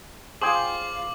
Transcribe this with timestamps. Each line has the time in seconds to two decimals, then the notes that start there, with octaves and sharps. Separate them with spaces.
0.42 F4 G#4 C5 F5 G5 D6 F#7